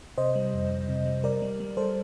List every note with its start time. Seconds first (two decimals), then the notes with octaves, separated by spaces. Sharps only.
0.18 C3 C5 D#5
0.35 G3
0.54 F2
0.71 F2
0.89 C3
1.06 G3
1.24 G3 A#4 D5
1.42 G3
1.60 G3
1.77 G3 A4 C5